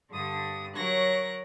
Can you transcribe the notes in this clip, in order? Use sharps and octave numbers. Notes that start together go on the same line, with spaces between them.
G2 D3 D4 D#6
F#3 A#4 C#5 C#6 F#6 A#6